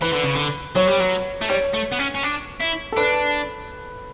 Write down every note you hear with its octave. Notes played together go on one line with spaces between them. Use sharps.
E3 B4
D3
C#3
D3
F#3 C#5
G3
F#3
A3
G3 C#5
A3
B3
C#4
C#4
D4
E4
A4
D4 B4